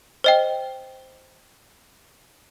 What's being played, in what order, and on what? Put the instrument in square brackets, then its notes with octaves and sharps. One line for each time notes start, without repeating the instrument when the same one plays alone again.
[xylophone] C5 D#5 G5